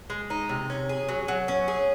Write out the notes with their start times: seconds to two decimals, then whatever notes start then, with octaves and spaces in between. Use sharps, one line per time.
0.10 G#3
0.30 D#4
0.49 C3
0.70 C#4
0.89 G#4
1.09 F#3
1.28 F#3
1.48 C#4
1.68 G#4